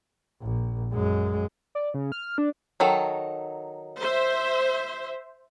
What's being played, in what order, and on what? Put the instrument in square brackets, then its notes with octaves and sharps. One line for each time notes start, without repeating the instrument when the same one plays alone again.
[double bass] A#1
F#2 G#3
[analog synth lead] D5
C#3
F6
D4
[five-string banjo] D#3 F#3 A4
[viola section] C5 E5